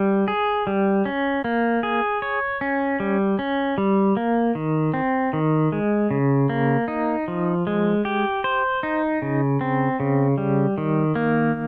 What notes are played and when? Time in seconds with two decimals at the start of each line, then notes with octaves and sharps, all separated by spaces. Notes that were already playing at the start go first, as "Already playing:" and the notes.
Already playing: G3
0.28 G#4
0.67 G3
1.05 C#4
1.44 A#3
1.83 G#4
2.22 C#5
2.61 C#4
3.00 G3
3.39 C#4
3.78 G3
4.17 A#3
4.55 D#3
4.94 C4
5.33 D#3
5.72 G#3
6.11 C#3
6.49 A#3
6.88 D#4
7.28 F3
7.67 G#3
8.05 G4
8.44 C5
8.83 D#4
9.22 C#3
9.61 C4
10.00 C#3
10.38 G3
10.78 D#3
11.15 A#3